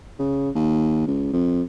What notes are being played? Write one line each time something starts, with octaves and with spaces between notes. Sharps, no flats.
C#3
D#2
C#2
F2